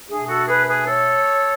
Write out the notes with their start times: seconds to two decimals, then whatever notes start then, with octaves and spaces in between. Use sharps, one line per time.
0.09 B2 A3 D4 G#4
0.28 F#4 A4
0.48 G#4 B4
0.67 G#4 B4
0.87 A4 C#5